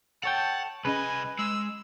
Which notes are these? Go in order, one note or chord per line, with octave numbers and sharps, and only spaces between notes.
A4 C#5 F#5 G5 A5
C2 C#4 G#4 B4 D#5 G#5
G#3 E6